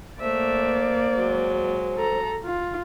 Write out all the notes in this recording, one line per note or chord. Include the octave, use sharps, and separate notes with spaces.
A3 A#3 C5 D5 E5
F#3 G#3
A4 A#5
F4